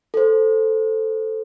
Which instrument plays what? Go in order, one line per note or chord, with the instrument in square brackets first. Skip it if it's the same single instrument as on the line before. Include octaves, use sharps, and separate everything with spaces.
[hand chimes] A4 C5